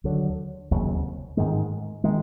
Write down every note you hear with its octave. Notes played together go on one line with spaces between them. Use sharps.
D#2 D3 F#3
F1 D#2 C#3 F#3
G#2 D#3 G#3
D#3 G#3